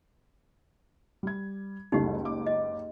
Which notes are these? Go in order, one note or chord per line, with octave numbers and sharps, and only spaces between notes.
G3 G#6
F#1 C#2 G3 A3 D#4 E4 G4
D6
D#5